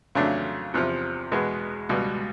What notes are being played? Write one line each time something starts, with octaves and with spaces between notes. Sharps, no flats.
F2 C#3 F#3 A3 D4
E2 C3 F3
E2 B2 G#3 B3
C#2 B2 G3